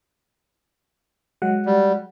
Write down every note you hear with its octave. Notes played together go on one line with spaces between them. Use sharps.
F#3 G#3 F#5
G3